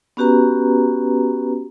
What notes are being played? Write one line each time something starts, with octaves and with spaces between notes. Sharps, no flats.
B3 C#4 F#4 G4 B4 A#5